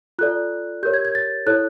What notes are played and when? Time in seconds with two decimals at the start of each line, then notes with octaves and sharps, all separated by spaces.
0.19 F4 A4 D5 F#6
0.83 G4 A#4 C#5 G6
0.94 G#6
1.05 G#6
1.15 A6
1.46 E4 A4 C#5 F#6